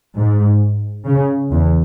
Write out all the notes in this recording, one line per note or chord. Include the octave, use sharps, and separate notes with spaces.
G#2
C#3
E2